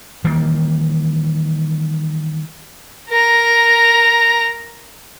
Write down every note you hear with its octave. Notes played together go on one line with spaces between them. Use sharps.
D#3 E3 G3 A#3
A#4 A#5